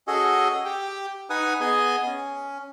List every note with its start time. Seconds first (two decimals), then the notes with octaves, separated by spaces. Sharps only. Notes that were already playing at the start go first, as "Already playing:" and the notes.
0.07 C#4 F#4 G#4 A4 D#5
0.65 G4 G5
1.30 D#4 B4 F#5 G#5 D#6
1.60 B3 G#4 D#5 G#5
2.06 C#4